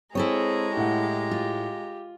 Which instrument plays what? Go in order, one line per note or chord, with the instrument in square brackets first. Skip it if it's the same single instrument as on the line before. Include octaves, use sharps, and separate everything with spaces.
[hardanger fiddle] G#3 A#5 [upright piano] C4 [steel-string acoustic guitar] E4 A4 C#5 [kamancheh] G#4
[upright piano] A2 F#5 [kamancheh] G4
[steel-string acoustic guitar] F4